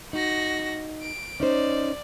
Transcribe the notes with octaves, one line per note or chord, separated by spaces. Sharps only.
D#4 F#4 A#6
D7
C#4 D#4 C5 D5